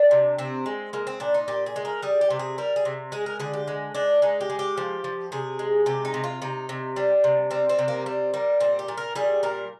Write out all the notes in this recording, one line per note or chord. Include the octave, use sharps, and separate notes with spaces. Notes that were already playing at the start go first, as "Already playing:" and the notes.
Already playing: D4
C3
C3 C4
G#3
G#3 A#3
C4
A#2 D4
D#4
A#2 G4
G#4
G#3
A#4
G3 G#4
G4
C3
G#4
G3 A#4
G#4
C3
G#3 G#4
A#4
D3 G#4
G4
G#3
G#3 D4
G#3 D#4
G4
G#3
G4
F3
F3
C3 G#4
G#3
C3 G4
D#4
C3
F4
C3 D#4
C3
G3 D4
C3
G3 C4
C4
C3
A#3
G3 C4
G3 A#3
A#2 C4
G4
A#2
A#4
G3 G#4
A#2 A#4